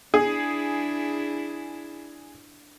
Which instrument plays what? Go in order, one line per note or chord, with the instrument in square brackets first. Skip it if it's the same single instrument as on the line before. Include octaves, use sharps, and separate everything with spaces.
[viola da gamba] D4 E4 [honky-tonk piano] G#4